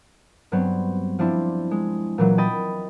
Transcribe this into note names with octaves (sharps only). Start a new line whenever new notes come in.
G2 F#3 B3 C4
F3 C4 D4 E4
G#3
A#2 E3 F#3
D#5 G5 B5 D#6 A6